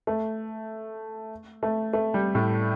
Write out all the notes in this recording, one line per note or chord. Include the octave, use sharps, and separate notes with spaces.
A3
A3
A3
G3
A2